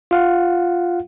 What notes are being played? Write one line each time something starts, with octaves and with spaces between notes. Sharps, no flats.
F4 F5 F#5